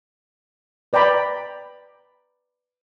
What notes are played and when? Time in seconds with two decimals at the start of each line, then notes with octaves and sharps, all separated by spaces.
0.93 B4 D5 G5 A#5 B5